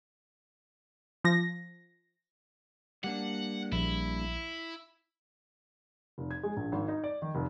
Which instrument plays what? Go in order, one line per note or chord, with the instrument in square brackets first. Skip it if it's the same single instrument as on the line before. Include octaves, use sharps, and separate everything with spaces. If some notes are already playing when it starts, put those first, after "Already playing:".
[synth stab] F3 A#6
[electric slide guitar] G3 A#3 D4 [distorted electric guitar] F#5
[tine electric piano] A#1 [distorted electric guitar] E4
[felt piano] F1
G#6
G#3
A#1
G#1
D#4
D5
D#3
F1